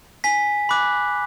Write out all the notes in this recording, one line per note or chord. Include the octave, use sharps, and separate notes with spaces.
G#5 B6
B5 D6 F#6